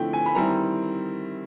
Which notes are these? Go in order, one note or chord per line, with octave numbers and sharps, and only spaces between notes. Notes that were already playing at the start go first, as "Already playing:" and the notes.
Already playing: D3 F3 A3 C4 E4 G5
G#5
B5
D#3 G3 C4 E4 A#5